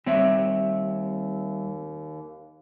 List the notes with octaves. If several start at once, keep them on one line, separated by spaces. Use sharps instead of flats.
D#2 G3 C4 C#5 E5